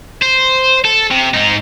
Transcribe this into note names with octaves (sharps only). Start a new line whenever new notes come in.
C5
A4
C3
G#2 D#4